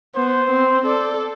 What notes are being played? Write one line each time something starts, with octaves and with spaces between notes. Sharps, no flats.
B3 C5
C4
A4 D5